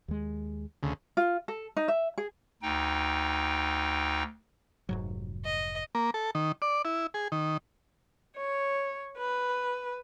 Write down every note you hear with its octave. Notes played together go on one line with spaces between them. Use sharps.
D#2 G#3
D2 C#3
F4
A4
D#4
E5
G#4
D2 D#4 G5
F1 G#2 F#3
D#5
A#3
A4
D#3
D5
E4
G#4
D#3
C#5
B4